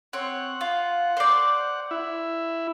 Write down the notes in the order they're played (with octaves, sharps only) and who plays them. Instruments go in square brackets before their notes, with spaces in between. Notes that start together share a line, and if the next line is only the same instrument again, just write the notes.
[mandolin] C4 C#5 [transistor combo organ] F#5
[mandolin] F4
C5 D5
[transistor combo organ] E4